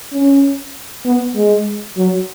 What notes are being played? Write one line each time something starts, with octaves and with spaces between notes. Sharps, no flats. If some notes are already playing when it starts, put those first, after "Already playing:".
C#4
B3
G#3
F#3